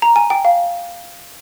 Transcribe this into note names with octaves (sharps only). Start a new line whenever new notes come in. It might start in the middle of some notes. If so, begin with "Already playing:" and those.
A#5
G#5
G5
F5